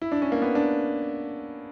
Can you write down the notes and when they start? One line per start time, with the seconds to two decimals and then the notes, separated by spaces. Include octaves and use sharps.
0.02 E4
0.12 D4
0.22 C#4
0.32 A#3
0.42 B3
0.55 D4